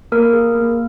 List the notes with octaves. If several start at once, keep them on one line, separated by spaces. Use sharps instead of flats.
A#3 A#4
G#4
A#3